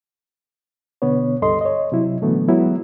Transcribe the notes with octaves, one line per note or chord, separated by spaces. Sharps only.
B2 D3 B3 C#5
C#2 G2 A4 D#5 C6
C#5 D#5
C3 F#3 E4
A#2 D3 E3 F#3 A3 B3
F#3 G#3 B3 E4